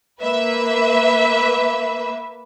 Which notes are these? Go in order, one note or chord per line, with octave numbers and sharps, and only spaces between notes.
A#3 B4 E5